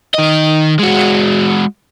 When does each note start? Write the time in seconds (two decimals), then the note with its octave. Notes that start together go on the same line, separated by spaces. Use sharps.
0.15 D#3 D#5
0.79 G#3 F#4